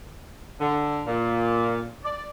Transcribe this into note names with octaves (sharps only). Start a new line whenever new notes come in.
D3
A#2
D5